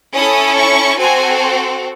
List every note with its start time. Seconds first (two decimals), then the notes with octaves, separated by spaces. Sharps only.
0.14 C#4 E4 A4 D#6
0.56 C#6
0.99 C4 F#4 A4 G#5